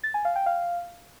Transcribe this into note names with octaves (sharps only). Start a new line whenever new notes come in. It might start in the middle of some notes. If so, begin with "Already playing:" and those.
A6
G#5
F5
G5
F5